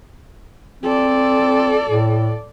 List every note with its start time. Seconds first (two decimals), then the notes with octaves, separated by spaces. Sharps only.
0.83 C4 A4 D5
1.87 A2